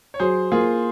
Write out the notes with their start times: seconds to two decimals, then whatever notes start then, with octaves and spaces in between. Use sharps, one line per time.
0.14 C#5
0.19 F#3 G#4 C5
0.52 A#3 F4 G#4